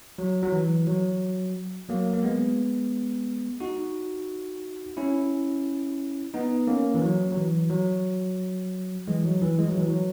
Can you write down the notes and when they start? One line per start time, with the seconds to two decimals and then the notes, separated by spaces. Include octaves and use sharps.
0.18 F#3
0.43 F#3
0.52 E3
0.87 F#3
1.89 F#3 A#3
2.13 A#3
2.23 G#3 B3
3.60 D#4 F#4
4.97 C#4 E4
6.34 B3 D#4
6.67 A#3 C#4
6.94 E3
7.02 F#3
7.32 F#3
7.37 E3
7.70 F#3
9.08 E3 G#3
9.25 F#3
9.42 E3
9.59 G#3
9.68 F#3
9.77 E3
9.88 F#3